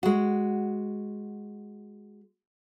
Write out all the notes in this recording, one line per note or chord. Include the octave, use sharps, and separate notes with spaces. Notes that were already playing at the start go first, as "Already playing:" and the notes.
G#3 F#4